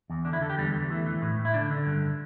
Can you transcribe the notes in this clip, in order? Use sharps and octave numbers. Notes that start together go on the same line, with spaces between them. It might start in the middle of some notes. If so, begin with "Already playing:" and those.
E2
D3 D4
E4
D3 A4
G4
E2 G3
E2
E3 A3
E3
A2
A2
E4
D3 D4
D3
G2